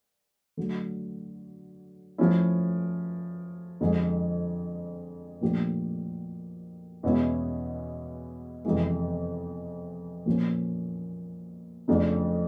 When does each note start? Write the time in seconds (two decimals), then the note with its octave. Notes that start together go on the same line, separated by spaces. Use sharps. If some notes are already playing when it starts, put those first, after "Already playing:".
0.57 D3 F#3 A3
2.18 F3 A3 C#4 E4
3.80 F2 D3 F3 G#3
5.41 A#2 F3 A3 D4 G4
7.03 E2 B2 G#3 C#4 E4
8.65 F2 C3 E3 G#3
10.26 A#2 F3 A#3 C#4
11.88 F2 C#3 F3 A3 D4